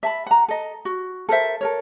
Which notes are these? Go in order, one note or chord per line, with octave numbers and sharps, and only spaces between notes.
E5 A5 B5
F#5 A#5
A4 D#5
F#4
A4 A#4 C5 E5
A4 A#4 C#5